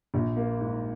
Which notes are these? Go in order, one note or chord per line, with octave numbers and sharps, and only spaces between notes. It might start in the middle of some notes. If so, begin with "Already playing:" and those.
A#1
A#3
G#2